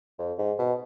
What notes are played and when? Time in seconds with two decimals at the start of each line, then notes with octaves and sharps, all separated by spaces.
0.19 F2
0.38 G#2
0.59 B2